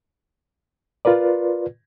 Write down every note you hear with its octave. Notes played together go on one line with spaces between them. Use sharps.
F4 A#4 B4 D5